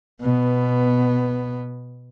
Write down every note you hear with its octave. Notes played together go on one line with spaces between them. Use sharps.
B2 B3